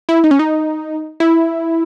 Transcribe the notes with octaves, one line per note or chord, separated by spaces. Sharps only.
E4
D#4
C#4
D#4
E4